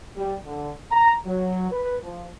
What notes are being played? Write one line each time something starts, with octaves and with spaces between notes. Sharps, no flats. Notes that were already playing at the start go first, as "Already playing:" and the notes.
G3
D3
A#5
F#3
B4
F3